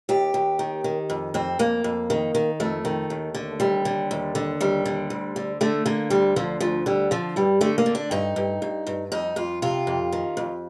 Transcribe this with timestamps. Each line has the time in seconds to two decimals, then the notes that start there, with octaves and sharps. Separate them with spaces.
0.09 D#2 G4
0.34 D#2
0.59 D#3
0.84 D#3
1.10 F2
1.34 F2 C4
1.59 F2 A#3
1.84 F2
2.10 D#3
2.35 D#3
2.60 F2 A3
2.85 D#3
3.10 D#2
3.35 D3
3.60 D#2 G3
3.85 D3
4.11 D#2
4.35 D3
4.61 D#2 G3
4.85 D3
5.10 D2
5.36 D3
5.61 D3 A3
5.86 D3 A#3
6.10 D2 G3
6.36 D3 F3
6.60 D2 F3
6.86 D3 G3
7.11 D3 F3
7.36 G2 G3
7.61 D3 A3
7.78 A#3
7.86 D3
7.95 D4
8.11 G2 D#4
8.36 G2
8.62 G2
8.87 G2
9.12 F2 D#4
9.36 F2 F4
9.62 C3 F4
9.87 F2
10.12 D#3
10.37 F2